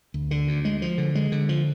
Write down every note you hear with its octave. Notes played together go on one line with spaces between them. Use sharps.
D2
D3
D2
G#3
F3
D3
G#3
D3
F3